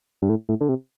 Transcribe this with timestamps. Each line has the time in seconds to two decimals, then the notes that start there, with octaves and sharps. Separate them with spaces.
0.22 G2
0.29 A2
0.49 A2
0.61 D3
0.69 C3